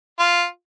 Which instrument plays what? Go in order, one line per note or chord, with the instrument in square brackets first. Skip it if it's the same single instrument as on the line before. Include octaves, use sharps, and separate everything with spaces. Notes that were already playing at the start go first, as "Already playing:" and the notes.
[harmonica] F4